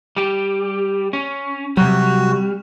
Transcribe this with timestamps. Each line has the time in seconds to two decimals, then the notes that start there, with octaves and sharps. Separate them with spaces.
0.16 G3 G4
1.13 C#4
1.77 C3 F#3 G3 F#4